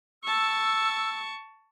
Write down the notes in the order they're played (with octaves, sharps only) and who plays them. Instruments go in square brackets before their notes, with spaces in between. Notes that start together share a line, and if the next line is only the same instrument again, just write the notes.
[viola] A5 C#6 [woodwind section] E6